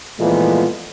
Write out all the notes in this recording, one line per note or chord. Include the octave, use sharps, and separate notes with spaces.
A#2 E3 F3 G#3 A3 B3